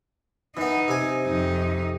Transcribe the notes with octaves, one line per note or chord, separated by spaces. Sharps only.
E3 B3 D#4
C3 G#5
F2 D#4